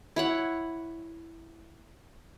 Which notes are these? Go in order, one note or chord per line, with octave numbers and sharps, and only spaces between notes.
E4 C#5 F#5